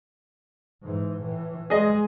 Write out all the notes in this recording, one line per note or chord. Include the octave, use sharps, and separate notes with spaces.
G#2 E3
A2 E3
G#3 G#4 D#5